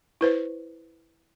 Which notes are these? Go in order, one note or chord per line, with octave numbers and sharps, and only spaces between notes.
E4 B4 C5